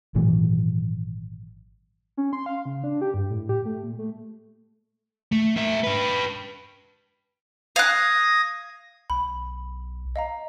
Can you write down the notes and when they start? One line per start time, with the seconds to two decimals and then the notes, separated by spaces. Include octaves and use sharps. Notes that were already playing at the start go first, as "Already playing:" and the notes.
0.15 G#1 A#2 E3 F#3
2.17 C#4
2.33 C6
2.46 F5
2.65 C#3
2.84 D4
3.01 G4
3.14 G2
3.30 A2
3.49 G4
3.66 A3
3.83 A#2
3.99 A3
5.32 A3
5.56 A#3 E5
5.83 G4 B4
7.76 F5 D#6 F#6 G#6 A#6
9.10 B1 B5
10.16 D#5 F5 A#5